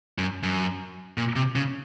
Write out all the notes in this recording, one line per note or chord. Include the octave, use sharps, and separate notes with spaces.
F#2
F#2
A#2
C3
C#3